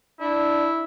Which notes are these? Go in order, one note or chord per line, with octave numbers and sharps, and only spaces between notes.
D4 E4